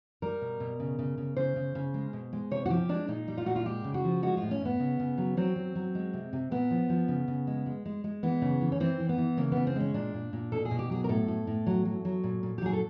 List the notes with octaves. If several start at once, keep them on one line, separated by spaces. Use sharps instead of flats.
G3 A#4
B2
B2
C#3
C#3
C#3
C#3 C5
C#3
C#3
G#3
B2
G#3
C3 C#5
F#4
F3 G4
G#3 D4
A#2 D#4
G3
F4
A#2 F#4
F4
G#3 G4
C#3
F#4
F3
G#3 F#4
A2 F4
C#4
A2 B3
C#3
C#3
F#3
F#3 C4
F#3
F#3
G#3
C3
C3
A#2 B3
F3
F3
C#3
C#3
G#3
G#3
G#3
G#3
E3 B3
C#3
E3
C#4
E3 C4
E3
B3
E3
C#3 A#3
C#3 B3
C4
G#3 C#4
A#2 D4
A#2
A#2
B2 A4
G#4
B2
G4
F#3 G#4
A#4
A2 A4
A2
A2
F#3
F#3
F#3
A#2
A#2
G4
F#3 G#4
A4